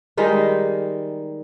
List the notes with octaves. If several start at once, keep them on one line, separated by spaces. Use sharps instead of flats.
D#3 G3 G#3 D#4